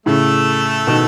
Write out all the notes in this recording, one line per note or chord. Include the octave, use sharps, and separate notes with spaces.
A2 C#3 A3 A4
B2 D#3